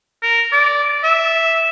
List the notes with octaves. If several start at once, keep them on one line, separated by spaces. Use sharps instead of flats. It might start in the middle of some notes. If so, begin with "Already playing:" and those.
A#4
D5
E5